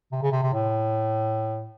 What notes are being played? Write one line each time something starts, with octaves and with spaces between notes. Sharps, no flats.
C3
C#3
C3
C3
A2